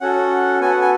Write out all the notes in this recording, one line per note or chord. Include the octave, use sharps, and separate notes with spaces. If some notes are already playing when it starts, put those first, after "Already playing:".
C#4 F#4 A4 F#5
B3 F#4 A4 G#5
F#5
G#5